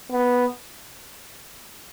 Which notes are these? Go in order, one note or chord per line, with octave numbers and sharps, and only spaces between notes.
B3